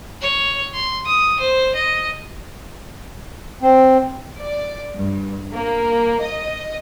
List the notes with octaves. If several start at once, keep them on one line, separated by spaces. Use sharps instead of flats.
C#5
C6
D#6
C5
D#5
C4
D5
G2
A#3
D#5